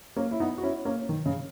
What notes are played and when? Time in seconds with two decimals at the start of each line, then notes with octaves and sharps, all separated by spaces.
0.16 A#3 C#4
0.31 E4
0.40 B3 D#4
0.58 F#4
0.62 C#4 E4
0.85 A#3 C#4
1.09 D#3
1.26 C#3